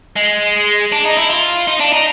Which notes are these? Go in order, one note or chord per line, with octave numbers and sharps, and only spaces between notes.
G#3
D4
D#4
E4
F4
D#4
D4
D#4